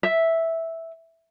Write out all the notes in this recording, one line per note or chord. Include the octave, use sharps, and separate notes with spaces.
E5